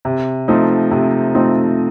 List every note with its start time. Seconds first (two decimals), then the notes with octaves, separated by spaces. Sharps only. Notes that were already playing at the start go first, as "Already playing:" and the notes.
0.05 C3
0.48 F3 A3 C4 D#4
0.91 C3
1.34 F3 A3 C4 D#4